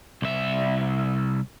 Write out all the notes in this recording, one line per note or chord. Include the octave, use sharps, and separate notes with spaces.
C2 E5